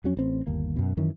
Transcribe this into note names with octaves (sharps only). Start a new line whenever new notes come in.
F2 F#3 C#4
A1 C4
G1 D#2 A#3
F#2 B2
F#2 D#3 E3 C#4